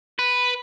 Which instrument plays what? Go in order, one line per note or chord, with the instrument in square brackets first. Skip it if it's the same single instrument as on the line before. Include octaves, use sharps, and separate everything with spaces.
[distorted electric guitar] B4